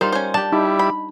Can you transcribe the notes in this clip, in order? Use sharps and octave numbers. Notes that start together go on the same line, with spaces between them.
G3 D#4 F4 A#4 C5
C#4 C5
D4 G4 A5
G3 D#4 E4
B5